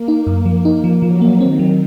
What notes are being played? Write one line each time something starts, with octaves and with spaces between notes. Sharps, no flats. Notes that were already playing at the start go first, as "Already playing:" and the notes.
Already playing: A#3
D#4
F#2
F3
A#3 D#4
F3
F3 F#3
A#3
D#3 C4
F#3